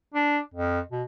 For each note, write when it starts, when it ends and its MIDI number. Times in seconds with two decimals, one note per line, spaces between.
0.14 0.40 62
0.54 0.80 41
0.91 1.03 47